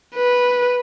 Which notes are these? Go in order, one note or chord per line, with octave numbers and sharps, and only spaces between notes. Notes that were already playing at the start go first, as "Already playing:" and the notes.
B4